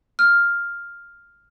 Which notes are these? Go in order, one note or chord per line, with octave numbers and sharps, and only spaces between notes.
F6